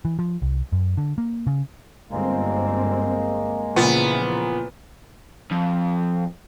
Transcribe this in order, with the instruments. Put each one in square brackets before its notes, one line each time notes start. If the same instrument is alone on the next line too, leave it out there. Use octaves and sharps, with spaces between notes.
[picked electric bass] E3
F3
C2
F#2
D3
A#3
C#3
[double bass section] G1 C4 [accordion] G#3 A#3
[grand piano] A#2 [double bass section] C#3 E3 F3 [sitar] B3
[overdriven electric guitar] F2